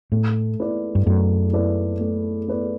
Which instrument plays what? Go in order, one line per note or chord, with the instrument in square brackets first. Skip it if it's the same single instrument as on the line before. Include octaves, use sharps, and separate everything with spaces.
[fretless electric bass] A2 [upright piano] A3
[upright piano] E4 B4 D5
[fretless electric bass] G2
[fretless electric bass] F#2 [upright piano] A3
[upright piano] E4 B4 D5
A3
E4 B4 D5